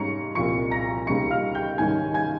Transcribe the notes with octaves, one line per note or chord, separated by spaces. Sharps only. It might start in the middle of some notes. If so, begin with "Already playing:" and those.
Already playing: G#2 G3 C#4 A#5 C#6 C#7
C2 A#2 F3 C#6 C#7
A#5 A#6
C#2 C#3 G3 A#3 D#4 C#6 C#7
F5 F6
G5 G6
G#2 D#3 G3 C#4 G#5 G#6
G#5 G#6